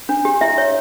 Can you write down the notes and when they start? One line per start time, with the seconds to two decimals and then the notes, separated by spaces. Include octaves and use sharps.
0.09 D4
0.25 G4
0.41 E4 E5
0.58 C#5